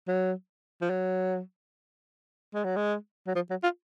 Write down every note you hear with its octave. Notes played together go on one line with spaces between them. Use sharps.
F#3
F3
F#3
G#3
F#3
G#3
F#3
F3
F#3
F4